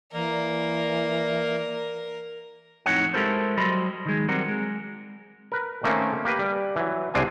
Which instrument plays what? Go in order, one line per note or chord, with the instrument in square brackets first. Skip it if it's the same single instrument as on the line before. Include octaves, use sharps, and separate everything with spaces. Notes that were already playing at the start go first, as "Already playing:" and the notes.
[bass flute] E3 [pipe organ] A#3 [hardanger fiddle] A#4 [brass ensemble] D5
[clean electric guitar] F2 A2 D#4 C#5 F#5
G#3 E4 G4 A4 A#4 C5
F#3 G3 C5 D#5 B5
D#3 G#3
F#3 G3 C4 A#4 F#5
G#3
[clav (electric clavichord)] A#4 B4
D#3 A3 A#3 C4 C#4
A#3 G4 B4
G3
E3 F#3
C2 G#3 C4 D4 F5 G#5